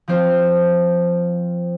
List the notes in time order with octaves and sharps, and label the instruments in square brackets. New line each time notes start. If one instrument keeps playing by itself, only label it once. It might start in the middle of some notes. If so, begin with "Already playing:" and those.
[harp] F3 C4 F4 C5